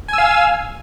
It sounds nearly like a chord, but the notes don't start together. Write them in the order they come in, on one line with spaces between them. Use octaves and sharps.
G#5 E6 F5